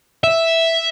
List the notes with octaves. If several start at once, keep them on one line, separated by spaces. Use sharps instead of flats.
E5